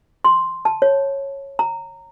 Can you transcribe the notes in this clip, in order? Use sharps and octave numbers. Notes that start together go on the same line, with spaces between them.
C6
A5
C#5
A#5